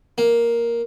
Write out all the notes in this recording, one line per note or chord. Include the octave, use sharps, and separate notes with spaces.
A#3